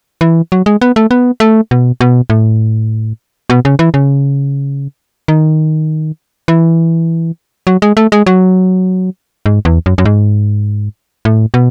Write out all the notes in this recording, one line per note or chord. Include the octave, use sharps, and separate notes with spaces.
E3
F#3
G#3
B3
A3
B3
A3
B2
B2
A2
B2
C#3
E3
C#3
D#3
E3
F#3
G#3
A3
G#3
F#3
G#2
E2
F#2
F#2
G#2
A2
B2